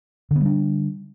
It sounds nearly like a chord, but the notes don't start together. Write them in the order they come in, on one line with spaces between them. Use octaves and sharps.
D3 B3 G3 D4